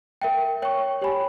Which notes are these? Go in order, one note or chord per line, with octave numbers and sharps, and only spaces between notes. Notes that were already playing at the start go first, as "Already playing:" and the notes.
A#4 E5 G5
C#5 G5 C#6
G4 C#5 G#5 B5